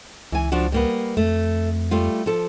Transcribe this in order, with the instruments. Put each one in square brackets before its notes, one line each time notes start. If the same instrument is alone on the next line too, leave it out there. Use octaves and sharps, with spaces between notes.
[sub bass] C#2 [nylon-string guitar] E3 G#5
[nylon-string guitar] F3 D4 F#4
G3 A#3 B3
[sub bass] F2 [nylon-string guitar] A3
[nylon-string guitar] G3 A3 F4
F3 A4